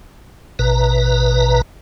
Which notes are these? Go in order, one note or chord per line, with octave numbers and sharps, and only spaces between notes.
A1 B2 B4 A#5